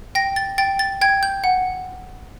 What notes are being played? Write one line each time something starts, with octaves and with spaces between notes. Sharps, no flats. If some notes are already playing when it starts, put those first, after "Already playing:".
G5 A#6
A6
G5 A6
A6
G5 G#6
G6
F#5